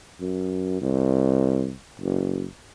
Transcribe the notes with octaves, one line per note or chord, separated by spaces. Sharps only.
F#2
C2
F#1